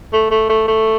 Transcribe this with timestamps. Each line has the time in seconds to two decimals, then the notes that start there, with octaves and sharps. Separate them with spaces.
0.13 A3
0.31 A3
0.49 A3
0.68 A3